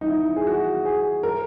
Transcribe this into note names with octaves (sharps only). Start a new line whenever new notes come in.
D#4
E4
G#4
F#4
G#4
A#4